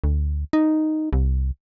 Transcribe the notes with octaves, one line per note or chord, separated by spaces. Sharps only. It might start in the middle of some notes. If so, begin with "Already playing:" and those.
D2
D#4
C2